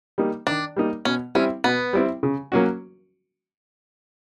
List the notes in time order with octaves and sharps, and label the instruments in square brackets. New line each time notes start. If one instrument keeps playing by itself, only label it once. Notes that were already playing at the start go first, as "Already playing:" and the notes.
[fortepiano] G3 A#3 D#4
[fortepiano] D#3 [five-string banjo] D4
[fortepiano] G3 A#3 D#4
[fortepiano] B2 [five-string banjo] C#4
[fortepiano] G3 C4 E4 [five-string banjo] C#4
[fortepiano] B2 [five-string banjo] B3
[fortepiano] G3 C4 E4
C#3
F#3 A#3 C#4 F#4